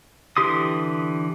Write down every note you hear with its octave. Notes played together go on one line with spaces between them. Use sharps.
D3 E3 G4 C6 D#6